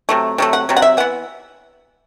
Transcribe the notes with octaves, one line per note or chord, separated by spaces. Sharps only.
C3 F#3 A3
C3 F#3 A3
F#5
C3 F#3
F#5
E5
E3 B3 F#5